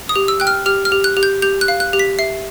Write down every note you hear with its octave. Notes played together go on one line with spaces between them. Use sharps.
D#6
G4
E6
G5 F#6
F6
G4 F6
F6
G4
F#6
G4
G6
G4 G6
F#6
F5
F#6
G4
B6
E5 C7